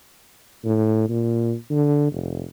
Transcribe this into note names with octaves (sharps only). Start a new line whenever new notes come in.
A2
A#2
D3
F1